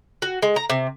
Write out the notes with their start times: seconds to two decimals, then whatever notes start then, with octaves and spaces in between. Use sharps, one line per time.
0.22 F#4
0.42 G#3
0.56 A#5
0.70 C3